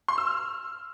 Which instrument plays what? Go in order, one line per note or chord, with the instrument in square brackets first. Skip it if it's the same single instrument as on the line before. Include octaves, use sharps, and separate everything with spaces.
[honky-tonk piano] C6
E6
F6